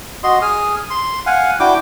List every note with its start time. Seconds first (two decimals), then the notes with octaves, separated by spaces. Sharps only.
0.23 F#4 D#5 C6
0.42 G#4 D#6 F6
0.90 C6
1.26 F5 F#5 G#5
1.60 D4 E4 F#4 G5 D6